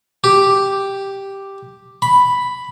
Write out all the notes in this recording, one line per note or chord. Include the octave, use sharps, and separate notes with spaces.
G4
B5